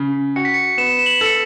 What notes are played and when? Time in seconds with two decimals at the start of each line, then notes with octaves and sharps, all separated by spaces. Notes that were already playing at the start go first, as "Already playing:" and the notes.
Already playing: C#3
0.36 F#4 C#7
0.45 B6
0.54 C#7
0.78 B3 E7
0.99 E7
1.06 F#7
1.21 A4 C#7